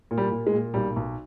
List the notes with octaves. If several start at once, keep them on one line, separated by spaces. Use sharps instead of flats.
A#2
G3
A#2
G#3
A#2
B1 G3
B1